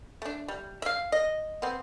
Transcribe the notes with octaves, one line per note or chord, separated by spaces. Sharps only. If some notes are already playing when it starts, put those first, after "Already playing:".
A3 D4
G3
E5 F5
D#5
B3 C4